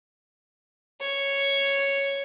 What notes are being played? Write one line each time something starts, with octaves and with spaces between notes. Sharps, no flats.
C#5